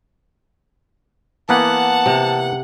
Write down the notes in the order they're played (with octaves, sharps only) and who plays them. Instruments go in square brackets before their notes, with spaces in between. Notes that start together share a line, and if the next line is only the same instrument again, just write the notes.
[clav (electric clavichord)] E3 A#3 B3 [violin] F#5 [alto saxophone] A5
[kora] C3